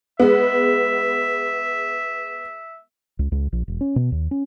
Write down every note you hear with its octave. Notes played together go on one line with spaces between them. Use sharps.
G#3 B3 E5
C#2
C#2
A#1
E1
C#4
B2
D#2
C#4